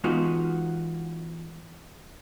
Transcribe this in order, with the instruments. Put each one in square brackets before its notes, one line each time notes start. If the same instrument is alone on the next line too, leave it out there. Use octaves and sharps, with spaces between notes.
[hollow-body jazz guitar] E3 G#3 B3 D#4 F4 F#4